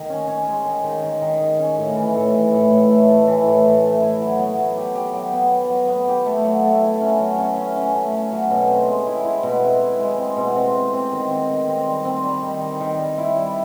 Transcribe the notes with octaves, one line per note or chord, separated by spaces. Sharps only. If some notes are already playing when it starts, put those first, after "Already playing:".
Already playing: D#3
C#4
C#4
G#3
D#3
D#3
D#3
D#3
D#3
C#4
A2
E3
A2
E3
A2
A2
A3
A3
E3
A2
A2
A3
E4
F#3
B3
F#3
G4
G4
F#3
B3
F#3
F#3
B3
G4
A3
F#3
A3
E4
C#4
F#3
C#4
C#4
C#4
A3
C#4
F#3
B2
C4
G#3
E4
E4
B2
C4
E4
G#3
C4
B2
C4
C4
C4
D#3
C4
D#3
C4
G3
C4
G3
D#3
D#3
D#3
G3
E4
G3